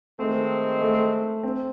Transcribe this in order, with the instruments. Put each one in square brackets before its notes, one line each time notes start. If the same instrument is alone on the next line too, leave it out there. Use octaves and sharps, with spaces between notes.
[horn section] D#3 G#3 C4 [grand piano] A3
[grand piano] A3
C4